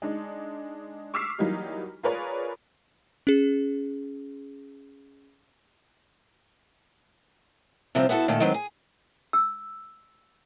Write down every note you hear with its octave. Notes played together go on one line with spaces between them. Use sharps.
G#3 D4 D#4
C#6 D6 E6 F6 B6 C7
E3 F#3 G3 A#3 D#4 G4
F4 G#4 A#4 B4 C#5 D5
C#4 G#4
C3 F3 G3 C4
B3 E4 F#4 G4 A4
A#2 D#3 A3 A5
D#3 F#3 G#3 C4 B4
G#4
E6